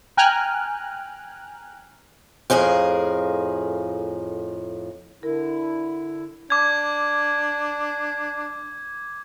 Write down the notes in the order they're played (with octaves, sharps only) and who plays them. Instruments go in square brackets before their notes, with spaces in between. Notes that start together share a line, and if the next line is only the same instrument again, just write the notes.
[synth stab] G5 G#5 A#5 F6 F#6
[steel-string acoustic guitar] F2 A2 G#4 A#4 F5
[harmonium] D3 E4 [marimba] A#4
[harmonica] D4 [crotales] D6 G#6